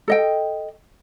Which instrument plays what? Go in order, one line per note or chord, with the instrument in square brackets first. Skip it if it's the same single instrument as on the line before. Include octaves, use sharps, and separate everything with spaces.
[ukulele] A4 D#5 G5